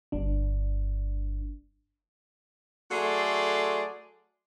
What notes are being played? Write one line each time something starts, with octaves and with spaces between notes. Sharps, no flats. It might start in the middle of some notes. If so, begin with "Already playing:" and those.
G1 G2 D4
F#3 A3 G#4 A4 D5 C6